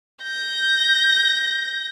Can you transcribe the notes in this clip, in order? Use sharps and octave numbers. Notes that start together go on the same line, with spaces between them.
G6 A#6